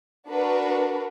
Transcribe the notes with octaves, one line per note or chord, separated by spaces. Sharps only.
D4 F#4 A#4 B4